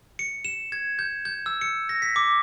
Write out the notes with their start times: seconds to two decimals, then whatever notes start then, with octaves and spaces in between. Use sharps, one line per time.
0.19 C#7
0.45 E7
0.72 G#6
0.99 G6
1.25 G6
1.46 E6
1.61 C#7
1.89 A#6
2.02 B6
2.16 D6